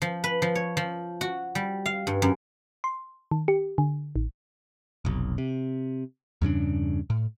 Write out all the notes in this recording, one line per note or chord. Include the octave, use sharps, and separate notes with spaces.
F3
B4
F3
C#5
F3
F#4
G3
F5
G2
F#2
C6
D#3
G4
D3
A1
F1 B1
C3
E2 G2 C#3 D4
A2